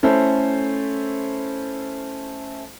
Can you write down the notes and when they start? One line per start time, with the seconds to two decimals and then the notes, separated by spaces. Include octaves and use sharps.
0.03 A3 C#4 E4 A4 C5